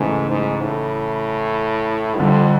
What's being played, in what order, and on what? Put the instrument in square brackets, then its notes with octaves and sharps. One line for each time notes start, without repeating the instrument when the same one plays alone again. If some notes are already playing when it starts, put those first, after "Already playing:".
Already playing: [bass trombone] G#2 [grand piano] C#3 E3 A3
[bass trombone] G#2
A2
[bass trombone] F2 [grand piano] D3 G3 C4